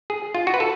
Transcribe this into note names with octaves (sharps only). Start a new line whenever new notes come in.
G#4
F4
F#4
B4
A4